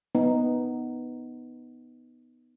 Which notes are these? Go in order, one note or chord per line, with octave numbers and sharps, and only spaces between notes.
B3 D#4